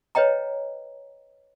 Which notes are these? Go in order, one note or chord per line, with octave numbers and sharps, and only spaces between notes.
B4 C#5 D#5 G5 A#5